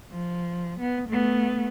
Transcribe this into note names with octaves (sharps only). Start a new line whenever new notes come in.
F3
B3
A3 B3